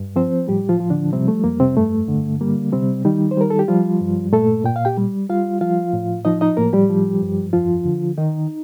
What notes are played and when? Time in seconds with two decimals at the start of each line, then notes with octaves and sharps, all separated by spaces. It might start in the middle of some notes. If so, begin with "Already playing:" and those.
Already playing: G2
0.16 F3 C4 C5
0.48 A2 G3 G4
0.69 F3 F4
0.80 F3
0.90 D3 D4
1.13 C3 G3 C4
1.28 A3
1.44 F2 A#3
1.60 C3 C4
1.77 G2 A3
2.08 D3
2.41 G3 A#3
2.73 C3 G3 C4
3.05 D#3 G3 D#4
3.31 C5
3.37 G3 A#4
3.50 A4
3.59 G4
3.68 F3 G3 F4
4.01 G2
4.33 A#2 A3 A4
4.64 A#2 G5
4.76 F5
4.85 G4 G5
4.98 G3
5.29 G3 F4 F5
5.61 F3 F4 F5
5.93 A2
6.25 F3 D#4 D#5
6.41 D#4 D#5
6.57 A2 A#3 A#4
6.73 G3 G4
6.90 F3
7.22 G2
7.53 F2 F3 F4
7.85 D3
8.18 D#3 D#4